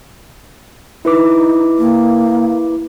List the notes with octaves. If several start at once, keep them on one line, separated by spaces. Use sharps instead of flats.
D#4 E4 B4 D6
A#3